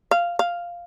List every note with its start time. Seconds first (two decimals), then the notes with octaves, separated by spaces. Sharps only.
0.11 F5
0.39 F5